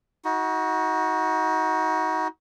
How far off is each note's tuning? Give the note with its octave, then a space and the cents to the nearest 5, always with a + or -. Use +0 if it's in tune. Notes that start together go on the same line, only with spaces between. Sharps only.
D#4 +35 F#4 +0